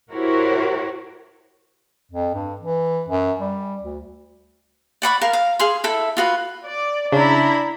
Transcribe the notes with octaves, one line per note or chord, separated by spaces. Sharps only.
E4 F#4 G4 A#4 C5 C#5
F2
G2
E3
F#2
G3
D2
D5 F#5 B5 C#6
A#4 F5
F5
G#4 F5 G#5 C6
E4 A4 E5
F4 F#4 B4
D5
C#3 D4 E4 A#5 B5